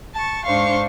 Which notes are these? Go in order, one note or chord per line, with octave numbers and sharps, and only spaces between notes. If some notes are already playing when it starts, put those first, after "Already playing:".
A5 C#6
G#2 D4 C5 F5 C#6